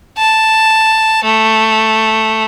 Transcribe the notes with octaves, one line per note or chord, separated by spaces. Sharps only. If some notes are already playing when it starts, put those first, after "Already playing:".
A5
A3